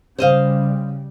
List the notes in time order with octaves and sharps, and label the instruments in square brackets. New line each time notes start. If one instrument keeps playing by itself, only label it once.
[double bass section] C#3 G3 [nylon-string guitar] C5 D#5 F5